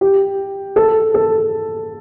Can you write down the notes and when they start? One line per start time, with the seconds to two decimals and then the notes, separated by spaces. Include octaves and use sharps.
0.01 G4
0.76 A4
1.14 A4